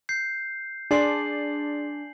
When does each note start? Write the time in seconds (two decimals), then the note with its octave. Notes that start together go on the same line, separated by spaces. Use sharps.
0.09 G6 C7
0.91 D4 G#4 D5 G#5 C6 C7 F#7